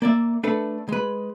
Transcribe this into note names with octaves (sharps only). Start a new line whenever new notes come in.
A#3 D5 E5
A3 D4 A4 B4
G#3 B4